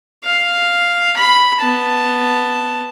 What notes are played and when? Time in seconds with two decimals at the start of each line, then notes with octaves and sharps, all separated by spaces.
0.24 F5
1.16 B5
1.61 B3 A5